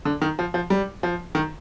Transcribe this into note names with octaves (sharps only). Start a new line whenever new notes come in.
D3
D#3
F3
F3
G3
F3
D#3